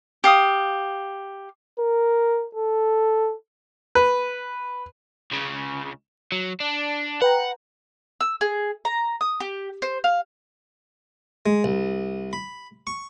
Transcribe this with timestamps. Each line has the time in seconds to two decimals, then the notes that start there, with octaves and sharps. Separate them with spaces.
0.24 G4 F5 D#6
1.80 A#4
2.55 A4
3.95 B4
5.31 C#2 C#3
6.32 F#3
6.60 D4
7.22 B4 F#5 G5 A#5
8.20 E6
8.41 G#4
8.85 A#5
9.21 D#6
9.40 G4
9.82 C5
10.04 F5
11.46 G#3
11.64 C2
12.33 B5
12.87 C#6